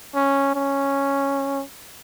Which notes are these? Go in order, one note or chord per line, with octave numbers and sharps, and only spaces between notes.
C#4
C#4